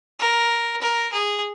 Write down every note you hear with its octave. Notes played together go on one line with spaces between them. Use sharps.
A#4
A#4
G#4